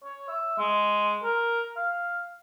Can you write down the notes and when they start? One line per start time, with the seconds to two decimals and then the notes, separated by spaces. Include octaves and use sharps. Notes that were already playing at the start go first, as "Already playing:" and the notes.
0.04 C#5
0.28 E5
0.58 G#3
1.24 A#4
1.76 F5